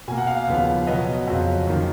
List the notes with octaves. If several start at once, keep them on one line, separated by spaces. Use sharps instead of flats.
B2 A#3 G#5
F#5
F5
F5
D#2 C#3 F3 B3
B2 F#3 B3 D#5
F2 C#3 F#3
F#2 D#3 A#3